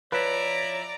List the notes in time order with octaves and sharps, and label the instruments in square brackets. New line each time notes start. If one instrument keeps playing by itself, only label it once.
[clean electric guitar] F3 E4 [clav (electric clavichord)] B4 [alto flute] C#5 [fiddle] D5 A#5